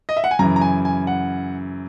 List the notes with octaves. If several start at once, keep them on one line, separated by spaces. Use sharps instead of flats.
D#5
E5
F#5
G#5
F#2 C#3 E3 A#5
A#5
G#5
G#5
F#5